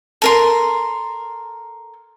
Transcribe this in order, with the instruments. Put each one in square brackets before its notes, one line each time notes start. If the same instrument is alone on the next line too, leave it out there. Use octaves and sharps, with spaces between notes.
[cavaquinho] A4 A#4 C6